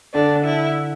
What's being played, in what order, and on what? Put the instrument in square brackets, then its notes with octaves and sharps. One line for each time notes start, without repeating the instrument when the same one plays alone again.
[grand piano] D3 [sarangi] D4
[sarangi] E4